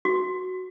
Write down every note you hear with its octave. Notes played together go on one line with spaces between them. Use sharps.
F#4